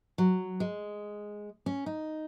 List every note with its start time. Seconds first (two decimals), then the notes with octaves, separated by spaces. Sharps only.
0.18 F#3
0.60 G#3
1.66 C#4
1.86 D#4